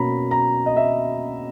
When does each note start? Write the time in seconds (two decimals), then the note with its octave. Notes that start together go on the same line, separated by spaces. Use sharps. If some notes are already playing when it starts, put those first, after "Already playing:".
Already playing: B2 A#3 C#4 A#5 B5
0.31 A#5
0.66 D#5
0.76 E5